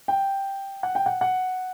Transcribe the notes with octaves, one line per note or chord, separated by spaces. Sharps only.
G5
F#5
G5
F#5
F#5